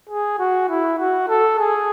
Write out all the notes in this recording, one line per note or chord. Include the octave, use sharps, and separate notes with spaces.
G#4
F#4
E4
F#4
A4
G#4